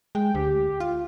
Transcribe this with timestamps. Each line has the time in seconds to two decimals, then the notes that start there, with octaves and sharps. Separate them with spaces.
0.15 G#3 G5
0.35 D2 G4
0.80 F4